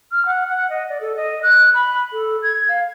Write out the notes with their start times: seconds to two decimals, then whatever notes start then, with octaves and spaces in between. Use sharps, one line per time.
0.12 F6
0.26 F#5
0.48 F#5
0.70 D#5
0.89 D5
1.01 A4
1.16 D#5
1.43 F#6
1.74 B5
2.13 A4
2.43 G#6
2.69 F5